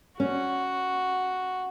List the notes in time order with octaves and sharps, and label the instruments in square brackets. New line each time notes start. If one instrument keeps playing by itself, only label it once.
[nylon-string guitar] C#4 [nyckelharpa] F#4